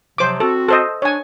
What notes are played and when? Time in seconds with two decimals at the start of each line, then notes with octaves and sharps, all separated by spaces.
0.18 C3 F3 F#3 C5 D6
0.40 C4 F#4 A4
0.69 A4 C5 D#5
1.02 D4 C#5 G#5